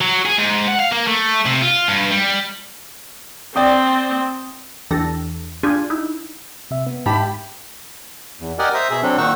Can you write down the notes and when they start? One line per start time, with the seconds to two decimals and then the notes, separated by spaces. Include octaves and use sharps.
0.01 F#3
0.25 G#4
0.38 G#2
0.67 F#5
0.79 F5
0.92 A#3
1.07 A3
1.46 C3
1.62 F4
1.88 G2
2.11 G3
3.56 C4 D5 G5 D#6
4.90 E2 E3 D4 G4 A4 A#6
5.63 D4 F4 G4 G#4 G#5
5.90 D#4 E4
6.71 C3 E5
6.87 B3
7.06 G#2 G4 A5 B5
8.40 E2
8.59 G4 A#4 D5 D#5 F#5 G#5
8.74 C5 E5 A#5 D#6
8.90 B2 G#4 E5
9.03 F#3 C4 D4 A4
9.18 A#2 D#3 D#4 F#5 C#6 E6